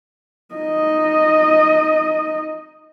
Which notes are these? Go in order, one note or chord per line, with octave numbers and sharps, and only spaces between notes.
D#4 D#5